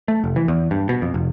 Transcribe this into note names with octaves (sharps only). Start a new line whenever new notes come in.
A3
F1
E3
E2
G2
B2
F2
F1